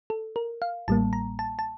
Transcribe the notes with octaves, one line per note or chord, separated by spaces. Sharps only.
A4
A#4
F5
A1 A2 G3 A#3 A5
A#5
A5
A5